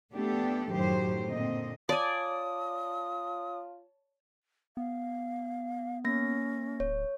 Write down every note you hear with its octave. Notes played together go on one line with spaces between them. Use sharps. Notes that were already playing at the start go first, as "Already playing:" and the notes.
A3 B3 D4 G4 A4
F#2 A2 D#3 F#3 G4 C5
A#2 D3 A#3 C4 D#5
F4 C#5 D5 G#5 A5 D#6
B3 F5
A#3 C#4 A#6
D1 C#5